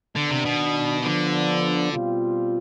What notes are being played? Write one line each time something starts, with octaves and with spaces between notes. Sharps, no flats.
D3 D#3 B3 D4
C3
B2
D3 F3 B3 D4
B2 G3 C4 F4